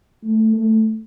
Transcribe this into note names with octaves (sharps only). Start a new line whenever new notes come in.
A3
A3